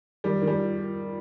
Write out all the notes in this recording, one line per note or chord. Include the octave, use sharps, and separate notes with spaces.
D#3 G3
D#3
G3